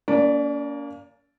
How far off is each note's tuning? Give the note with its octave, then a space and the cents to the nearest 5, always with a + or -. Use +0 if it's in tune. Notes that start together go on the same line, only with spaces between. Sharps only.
A#3 +0 C#4 +45 D5 +0